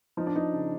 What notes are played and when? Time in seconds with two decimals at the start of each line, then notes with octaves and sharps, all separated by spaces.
0.17 F3 D#4
0.27 D4
0.36 F3 D#4
0.53 C#3